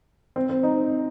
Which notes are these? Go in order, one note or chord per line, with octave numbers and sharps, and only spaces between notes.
C4
C4
D#4